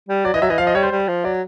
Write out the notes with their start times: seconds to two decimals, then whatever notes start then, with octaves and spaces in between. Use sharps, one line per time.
0.09 G3
0.25 F#3 D5
0.34 E3 D#5
0.42 F#3 E5
0.50 E3 D#5
0.58 F3 F5
0.67 D#5
0.75 G3 C#5
0.83 C5
0.91 G3
1.08 F3
1.24 F#3 D5